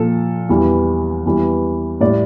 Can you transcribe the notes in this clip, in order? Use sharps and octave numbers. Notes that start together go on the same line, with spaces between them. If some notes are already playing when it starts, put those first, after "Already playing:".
Already playing: A#2 F3 A4
E2 E3 G3
E2 E3 G3
A2 G3 D5